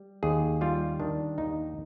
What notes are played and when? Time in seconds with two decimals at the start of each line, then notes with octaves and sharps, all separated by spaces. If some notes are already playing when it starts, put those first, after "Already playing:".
Already playing: G3
0.23 D#2 G#4
0.61 G3 F4
1.00 D#3 D4
1.38 D#2 D#4